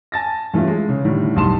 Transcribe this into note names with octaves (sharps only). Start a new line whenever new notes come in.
G#5 A5 A6 A#6
G2 E3 A3 C#4 F4
G#3
C#3
A2 D3 D#3 G3
B1 G2 D#4 A5 C6 E7